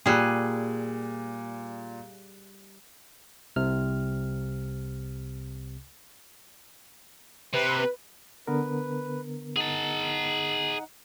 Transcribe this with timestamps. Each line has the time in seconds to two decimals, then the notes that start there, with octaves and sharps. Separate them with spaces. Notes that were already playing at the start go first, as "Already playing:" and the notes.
0.06 A#2 G3 G#4 F#6
3.56 C2 C3 F6
7.54 C3 B4
8.47 D3 B3 A#4 B4
9.56 D#4 G#4 F#5 A5